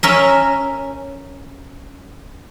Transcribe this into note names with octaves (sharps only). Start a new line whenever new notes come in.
C#4 A#4 E5